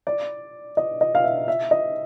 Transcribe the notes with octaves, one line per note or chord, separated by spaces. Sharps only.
D5
D#5
D#5
F5
E5
E5
D#5